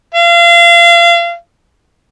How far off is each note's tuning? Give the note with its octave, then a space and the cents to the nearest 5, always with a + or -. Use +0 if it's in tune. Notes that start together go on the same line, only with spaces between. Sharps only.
F5 -30